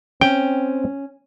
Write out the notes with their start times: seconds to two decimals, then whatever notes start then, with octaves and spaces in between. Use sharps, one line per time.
0.21 C4 C#4 G5